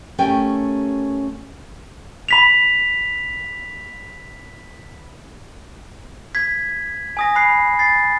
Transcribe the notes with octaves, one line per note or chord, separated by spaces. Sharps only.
A3 C#4 G4 A#4 G5 G#5
B5 B6 F7
G#6 B6
G#5 D#6 A#6
B5 F#6 C7
A6 C7